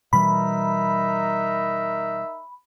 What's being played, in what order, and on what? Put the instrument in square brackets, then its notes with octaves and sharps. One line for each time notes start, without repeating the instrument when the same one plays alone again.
[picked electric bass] B2 E3 G3 [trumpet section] D#4 A#4 E5 [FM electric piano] B5